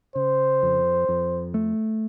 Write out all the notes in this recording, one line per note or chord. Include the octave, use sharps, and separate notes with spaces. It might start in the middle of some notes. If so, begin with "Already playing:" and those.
C#3 C5
F2
F2
A3